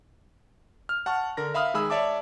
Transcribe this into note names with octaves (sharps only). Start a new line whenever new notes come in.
F6
F#5 A5 C#6 F6
D3 A#4 A#6
E5 F5 B5 D#6 F6
D#3 G#3 G#4 B5 E6
C#5 D5 E5 A5 D6